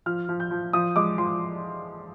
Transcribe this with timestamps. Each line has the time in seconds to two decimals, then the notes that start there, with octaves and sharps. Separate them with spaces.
0.06 F3 F6
0.29 F3
0.40 G6
0.51 F3
0.73 F3 D#6
0.96 G#3 D6
1.18 F3 C6